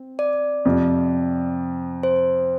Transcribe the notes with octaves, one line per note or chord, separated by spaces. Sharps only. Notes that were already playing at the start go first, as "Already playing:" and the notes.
Already playing: C4
D5
F2 C3 F3
C5